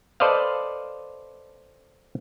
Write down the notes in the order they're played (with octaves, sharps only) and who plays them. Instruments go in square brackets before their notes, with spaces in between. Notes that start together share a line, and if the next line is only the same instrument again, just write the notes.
[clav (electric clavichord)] A4 B4 C5 D5 D#5 F5